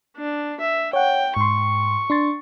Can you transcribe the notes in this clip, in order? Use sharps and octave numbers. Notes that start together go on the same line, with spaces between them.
D4
E5
C#5 F#5 G5
G#2 C6 C#6
D4 C6 A6